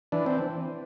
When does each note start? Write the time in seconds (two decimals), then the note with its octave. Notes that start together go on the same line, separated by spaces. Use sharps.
0.12 E3 D4
0.26 C4